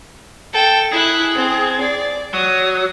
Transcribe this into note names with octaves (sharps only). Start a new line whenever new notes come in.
A4 G5
E4 G#4 F#6
C4
D5
F#3 D#6